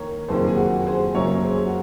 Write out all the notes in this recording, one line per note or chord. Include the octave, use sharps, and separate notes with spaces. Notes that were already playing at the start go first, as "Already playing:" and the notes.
Already playing: D#3 A#3 A#4 C#5
F#1 F2 D#3 A#3 G#4 C5
G#4
F#4
G#4 C5
F#2 C#3 F#3 A#3 A#4 C#5
G#4 C5
F#4